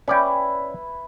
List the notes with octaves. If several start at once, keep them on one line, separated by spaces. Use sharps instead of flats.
C#4 E4 B4 D5 G5